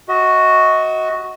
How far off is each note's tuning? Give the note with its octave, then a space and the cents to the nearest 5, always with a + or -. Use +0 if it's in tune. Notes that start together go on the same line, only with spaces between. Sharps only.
F#4 +0 D#5 +30